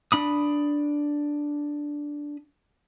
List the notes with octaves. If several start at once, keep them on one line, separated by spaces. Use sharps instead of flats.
D4 B5 D#6